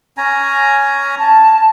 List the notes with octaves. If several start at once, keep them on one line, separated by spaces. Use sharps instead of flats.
C#4 G#5 A#5
A5